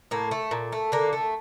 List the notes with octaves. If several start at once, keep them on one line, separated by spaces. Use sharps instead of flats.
A2 A#3
A3
A#2
A3
D3 A#3
A3